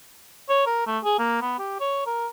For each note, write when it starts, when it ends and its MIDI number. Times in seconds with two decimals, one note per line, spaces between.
0.49 0.64 73
0.66 0.86 70
0.87 0.99 57
1.04 1.18 68
1.19 1.41 58
1.42 1.56 59
1.59 1.80 67
1.80 2.03 73
2.06 2.27 70